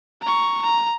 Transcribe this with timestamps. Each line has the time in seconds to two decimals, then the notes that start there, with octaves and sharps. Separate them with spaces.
0.21 A#5 C#6
0.62 A#5